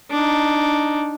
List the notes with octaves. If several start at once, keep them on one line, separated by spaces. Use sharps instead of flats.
D4 D#4